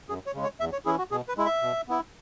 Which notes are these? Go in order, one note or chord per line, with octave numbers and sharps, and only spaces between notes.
F#2 G#4
C#5
C#3 G#3
C#5
E2 E5
C#5
E3 C#4 E4 G#4
F#4
B2 G#4
B4
G#3 E4
E5
B2
B3 E4